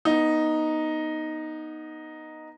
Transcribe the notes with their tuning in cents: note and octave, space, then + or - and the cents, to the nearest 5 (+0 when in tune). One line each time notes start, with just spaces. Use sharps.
B3 -20 D#4 +0